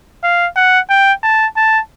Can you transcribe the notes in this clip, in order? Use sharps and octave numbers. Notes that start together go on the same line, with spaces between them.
F5
F#5
G5
A5
A5